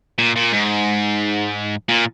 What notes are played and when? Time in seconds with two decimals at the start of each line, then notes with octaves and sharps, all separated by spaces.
0.18 A#2
0.36 A#2
0.52 G#2
1.89 A#2